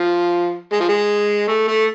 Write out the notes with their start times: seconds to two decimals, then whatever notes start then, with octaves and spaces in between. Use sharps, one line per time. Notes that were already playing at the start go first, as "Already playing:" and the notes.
Already playing: F3
0.73 G#3
0.80 F3
0.89 G#3
1.48 A3
1.68 A3